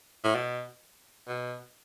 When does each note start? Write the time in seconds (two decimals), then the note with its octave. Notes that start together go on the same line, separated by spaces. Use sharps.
0.24 A2
0.35 B2
1.28 B2